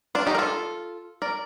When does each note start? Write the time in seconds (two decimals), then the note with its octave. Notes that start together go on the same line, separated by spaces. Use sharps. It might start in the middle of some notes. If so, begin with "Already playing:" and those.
0.15 D4 F4
0.27 D#4 G4
0.35 A#4
0.38 F4 A4
1.22 A#4 D5